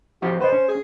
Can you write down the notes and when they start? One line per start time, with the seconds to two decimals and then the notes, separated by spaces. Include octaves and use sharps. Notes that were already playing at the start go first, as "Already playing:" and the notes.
0.22 F3 C4 F#4 G4
0.41 B4 C5 D#5
0.52 C#4
0.68 G#4